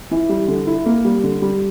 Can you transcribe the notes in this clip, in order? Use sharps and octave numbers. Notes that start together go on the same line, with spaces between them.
E3
G3
D3
E4
A#3
G3
D3
G3